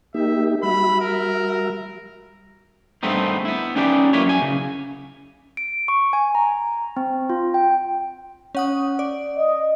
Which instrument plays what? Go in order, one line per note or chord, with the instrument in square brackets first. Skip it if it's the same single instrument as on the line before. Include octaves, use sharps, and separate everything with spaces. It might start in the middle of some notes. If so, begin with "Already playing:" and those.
[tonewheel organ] A#3 D#4 G4 [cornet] E5
[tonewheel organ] G3 F#4 E5 [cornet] B5
[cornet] A#4
[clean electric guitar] G2 A3 B3 C4 D#4
B3 E4
C#4 D#4 G4 B4 D5
F#3 A#3 E4 B4 C#5
F#2 G#5
C#3
[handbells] D7
C#6
G#5
A#5
C4
F4
G5
[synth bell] C#4 F#5 D#6
D5
[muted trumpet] D#5